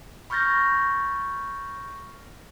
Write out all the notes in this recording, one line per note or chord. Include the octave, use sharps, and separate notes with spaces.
B5 C#6 F6 G6 A6 A#6